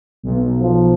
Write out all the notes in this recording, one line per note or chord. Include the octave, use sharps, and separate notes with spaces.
B1
F3